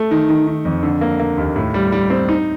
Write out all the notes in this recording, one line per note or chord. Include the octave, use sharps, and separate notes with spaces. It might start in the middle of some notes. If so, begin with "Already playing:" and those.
Already playing: A3
D#3
D#3
D#3
F2
D3
A#3
A#3
D#2
A2
G3
G3
C4
D#4